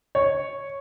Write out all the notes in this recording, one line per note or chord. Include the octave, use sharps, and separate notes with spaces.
C#5